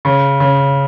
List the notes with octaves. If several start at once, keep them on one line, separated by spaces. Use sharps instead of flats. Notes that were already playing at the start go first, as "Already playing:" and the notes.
C#3
C#3